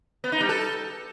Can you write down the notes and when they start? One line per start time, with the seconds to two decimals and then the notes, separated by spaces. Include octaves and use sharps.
0.24 B3
0.32 D#4
0.41 G3
0.49 A4